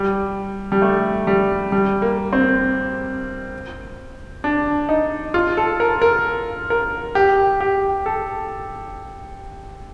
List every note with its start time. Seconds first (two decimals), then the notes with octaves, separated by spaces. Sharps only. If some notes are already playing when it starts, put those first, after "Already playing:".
Already playing: G3
0.72 G3
0.82 A3
1.27 G3
1.72 G3
2.02 A#3
2.33 C4
4.44 D4
4.89 D#4
5.34 F4
5.57 A4
5.80 A#4
6.02 A#4
6.70 A#4
7.15 G4
7.61 G4
8.06 A4